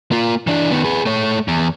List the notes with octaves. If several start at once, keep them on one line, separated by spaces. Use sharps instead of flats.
A#3 F4
E3 D4
D#3 B3
G#4 B4
A3 C#5
E2